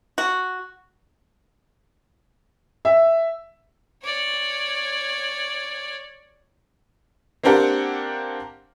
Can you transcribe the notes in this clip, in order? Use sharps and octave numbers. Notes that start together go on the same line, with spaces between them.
F#4
E5
C#5 D5
A#3 C4 D4 G4 A#4 F#5